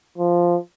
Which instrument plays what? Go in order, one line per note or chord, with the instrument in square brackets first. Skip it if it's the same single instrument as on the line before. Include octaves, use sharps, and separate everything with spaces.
[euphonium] F3